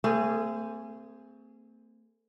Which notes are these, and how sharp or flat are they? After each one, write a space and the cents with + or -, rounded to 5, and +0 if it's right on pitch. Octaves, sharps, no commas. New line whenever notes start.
A3 +35 C4 -25 G#4 +0